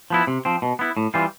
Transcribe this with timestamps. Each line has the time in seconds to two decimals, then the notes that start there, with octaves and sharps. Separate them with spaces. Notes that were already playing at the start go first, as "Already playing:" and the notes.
0.10 F3 B3 E4
0.27 C3
0.45 F3 C4
0.62 B2
0.79 B3 E4
0.97 A2
1.14 E3 G3 C4 F4